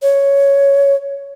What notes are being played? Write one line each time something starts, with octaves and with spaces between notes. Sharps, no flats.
C#5